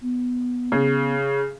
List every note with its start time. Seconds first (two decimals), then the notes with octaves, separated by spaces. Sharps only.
0.01 B3
0.72 C#3